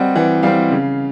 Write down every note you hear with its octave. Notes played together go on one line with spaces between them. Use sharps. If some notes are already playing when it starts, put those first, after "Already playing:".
Already playing: G3 C4 D#5 F#5
E3 F#5
G3 C4 F5
C#3